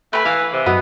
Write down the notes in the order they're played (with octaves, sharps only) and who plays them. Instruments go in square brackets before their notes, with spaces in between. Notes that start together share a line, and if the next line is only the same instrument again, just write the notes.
[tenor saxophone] A3 [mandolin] B4 G#5
[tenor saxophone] E3 [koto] F5
[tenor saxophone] C3
[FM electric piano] F#2 F#4 D#5 [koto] B3